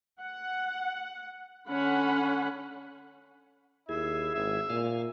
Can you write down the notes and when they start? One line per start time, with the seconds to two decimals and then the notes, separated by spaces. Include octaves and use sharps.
0.22 F#5
1.68 D3 C#4 F#5 B5
3.89 D#2 E4 G#4 E5
4.34 G#1 E5
4.70 A#2 F5 G#5